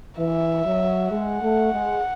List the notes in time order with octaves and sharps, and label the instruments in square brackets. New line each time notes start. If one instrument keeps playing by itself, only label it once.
[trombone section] E3 [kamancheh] E5
[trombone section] F#3
[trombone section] G#3 [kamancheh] F#5
[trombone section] A3
G#3